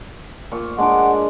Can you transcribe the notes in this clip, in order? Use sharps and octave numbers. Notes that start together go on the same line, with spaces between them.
A#2 C#6
G#3 D4 F#5 D6